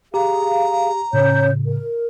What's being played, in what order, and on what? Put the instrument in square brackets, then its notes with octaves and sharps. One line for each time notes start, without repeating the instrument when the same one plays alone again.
[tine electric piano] G4 [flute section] G#4 F5 [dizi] A#5
[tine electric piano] A2 C#3 [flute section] C#4 C#5 G6
[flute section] A#4